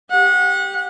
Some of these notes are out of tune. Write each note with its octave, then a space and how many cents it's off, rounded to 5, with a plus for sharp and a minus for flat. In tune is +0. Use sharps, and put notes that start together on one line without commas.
G4 +0 F#5 -30